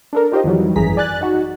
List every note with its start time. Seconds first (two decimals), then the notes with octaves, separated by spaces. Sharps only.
0.13 D4 A4 A#4
0.32 D#4 F4 G4 A#4 C5 D#5
0.44 F2 D#3 E3 F#3 G3
0.76 G#1 F#2 E3 G#4 A#5 B6
0.97 D5 G#5 F#6 A6
1.21 D#4 F#4